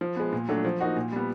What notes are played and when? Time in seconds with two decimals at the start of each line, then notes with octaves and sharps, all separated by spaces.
0.01 F3
0.16 G#3 B3
0.32 A#2
0.49 F#3 A3 D4
0.65 F3
0.80 A#3 D#4 F#4
0.96 A#2
1.12 G3 B3